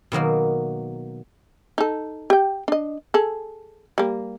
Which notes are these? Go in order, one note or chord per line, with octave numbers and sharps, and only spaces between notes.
B2 D#3 F#3 A#3
D#4 A4
G4 G5
D4 D#5
G#4 A4
G3 A#3